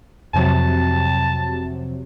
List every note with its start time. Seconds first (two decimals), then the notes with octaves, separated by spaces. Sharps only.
0.34 F2 C3 F#3 A5